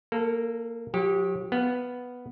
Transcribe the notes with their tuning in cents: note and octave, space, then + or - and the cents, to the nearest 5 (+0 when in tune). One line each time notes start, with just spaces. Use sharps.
A#3 -10 A4 +20
F#3 -40 G4 +0
B3 +0 F5 +0